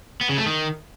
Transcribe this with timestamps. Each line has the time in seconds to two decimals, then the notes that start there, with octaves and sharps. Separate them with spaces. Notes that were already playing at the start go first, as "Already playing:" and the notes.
0.21 B3
0.29 C#3
0.38 A3
0.46 D#3